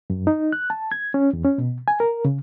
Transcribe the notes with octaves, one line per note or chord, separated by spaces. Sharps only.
F#2
D#4
F#6
A5
G#6
C#4
E2
C#4
B2
G#5
A#4
C#3